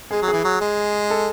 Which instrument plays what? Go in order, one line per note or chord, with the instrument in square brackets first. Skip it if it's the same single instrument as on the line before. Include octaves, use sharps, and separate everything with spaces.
[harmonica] G#3 [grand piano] G#4
[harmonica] F#3
[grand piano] G#4
[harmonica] E3
F#3
G#3
[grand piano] A4